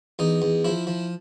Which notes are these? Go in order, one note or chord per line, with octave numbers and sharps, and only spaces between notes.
E2 D#4
E2
F3 E4
F3